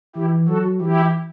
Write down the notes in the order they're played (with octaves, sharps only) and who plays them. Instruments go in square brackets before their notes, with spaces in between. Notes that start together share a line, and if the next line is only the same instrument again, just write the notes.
[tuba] E3 [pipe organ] E4 G4
[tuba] F#3 [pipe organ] F#4 A4
[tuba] E3 [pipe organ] E4 G4